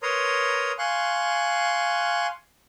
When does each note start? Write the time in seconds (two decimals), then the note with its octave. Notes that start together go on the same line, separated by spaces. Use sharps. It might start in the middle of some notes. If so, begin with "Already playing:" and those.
0.02 A#4 B4 C#5 A#5 C6 D#6
0.78 F5 G#5 C6 C#6 F#6